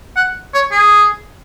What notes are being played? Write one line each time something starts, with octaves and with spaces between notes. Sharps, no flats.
F#5
C#5
G#4